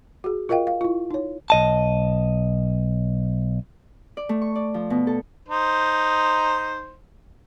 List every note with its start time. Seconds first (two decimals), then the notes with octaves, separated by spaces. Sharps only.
0.24 F#4 G#4
0.49 F4 A#4 D#5 F5 G5
0.67 F5
0.81 E4 F4
1.11 D#4 C#5
1.50 B1 D#5 A5
4.17 D5
4.29 A3
4.42 C#6
4.55 D5
4.74 F3
4.90 B2
5.07 A4
5.49 D#4 C5